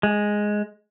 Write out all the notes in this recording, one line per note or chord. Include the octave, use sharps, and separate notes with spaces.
G#3